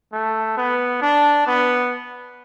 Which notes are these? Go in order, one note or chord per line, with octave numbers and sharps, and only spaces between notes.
A3
B3
D4
B3